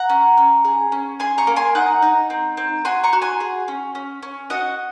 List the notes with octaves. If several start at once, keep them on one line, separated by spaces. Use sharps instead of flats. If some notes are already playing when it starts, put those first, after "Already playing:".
Already playing: F#5 A#5
C#4
C#4
G#4
C#4
G#4 G#5 C6
A#5 C#6
A#3
G#5 C6
D#4 F#5 A#5
D#4
C4
C4
F#4 G#5 C6
A#5 C#6
F#4
G#5 C6
G#4
C#4
C#4
C#4
F#4 D#5 F#5